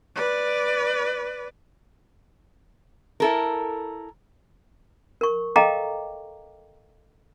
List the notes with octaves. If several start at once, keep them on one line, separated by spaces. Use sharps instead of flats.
B4 D5
E4 A4 A#4
A#4 C#6
A4 D#5 F5 G5 A#5 D6